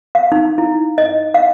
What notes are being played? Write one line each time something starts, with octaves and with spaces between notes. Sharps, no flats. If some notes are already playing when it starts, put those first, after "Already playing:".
F5
D#4
E4
D#5
F5